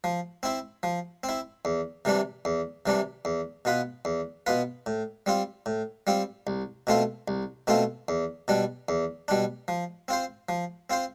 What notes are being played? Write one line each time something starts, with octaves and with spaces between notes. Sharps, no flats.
F3
C4 E4
F3
C4
E4
E2
C3 E3 G3 D4
E2
C3 E3 G3 D4
E2
B2 B3 F4 B4
E2
B2 B3 F4 B4
A2
G3 C4 F4
A2
G3 C4 F4
C2
B2 A3 C4 F4
C2
B2 A3 C4 F4
E2
B2 G3 D4
E2
B2 G3 D4
F3
C4 F4 C5
F3
C4 F4 C5